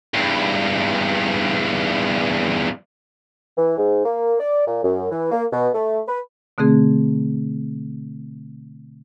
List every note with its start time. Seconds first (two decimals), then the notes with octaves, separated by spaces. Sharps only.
0.14 E2 G2
3.57 E3
3.78 G#2
4.05 A#3
4.39 D5
4.67 A#2
4.84 F#2
5.11 E3
5.32 A#3
5.52 B2
5.74 A3
6.07 B4
6.58 B2 D3 A3 C4 G#4